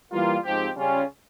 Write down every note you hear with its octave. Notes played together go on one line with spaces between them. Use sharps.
E3 G3 A#3 F4
G#2 F3 C4 G4
C#3 G3 C#4 F4